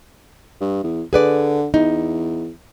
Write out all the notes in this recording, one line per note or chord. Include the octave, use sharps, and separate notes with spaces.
G2
E2
D3 G#4 B4 D5
E2 D#4